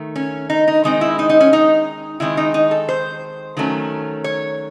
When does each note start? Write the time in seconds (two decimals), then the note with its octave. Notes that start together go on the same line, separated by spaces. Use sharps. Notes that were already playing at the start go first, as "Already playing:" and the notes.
Already playing: D#3 A3
0.16 C#4
0.50 D#4
0.68 D#4
0.84 D#3 G#3 C4 D#4
1.01 E4
1.19 D#4
1.30 D#4
1.41 C#4
1.53 D#4
2.20 D#3 G#3 C4 E4
2.37 D#4
2.54 D#4
2.71 A4
2.89 C5
3.57 D#3 F#3 A3 C#4
4.24 C#5